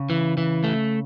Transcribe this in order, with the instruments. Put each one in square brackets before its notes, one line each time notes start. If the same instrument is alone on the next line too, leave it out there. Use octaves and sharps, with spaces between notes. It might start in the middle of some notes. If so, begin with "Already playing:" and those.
Already playing: [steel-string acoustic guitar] C#3
[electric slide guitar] E3
E3
A3